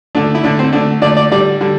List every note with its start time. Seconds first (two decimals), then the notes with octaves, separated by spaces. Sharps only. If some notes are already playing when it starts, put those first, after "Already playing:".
0.15 D3 A3 D4
0.35 E4
0.44 D3 A3 D4
0.59 C4
0.73 D3 A3 D4
1.02 D3 D5
1.05 A3
1.17 D5
1.31 D3 G3 D5
1.61 D3 G3